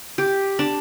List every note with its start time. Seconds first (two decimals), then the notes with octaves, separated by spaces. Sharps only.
0.18 G4
0.59 D4